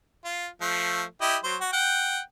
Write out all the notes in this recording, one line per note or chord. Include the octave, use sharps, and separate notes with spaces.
F4
F3 A3
E4 G4 D#5
F#3 C5
F#4
F#5 G5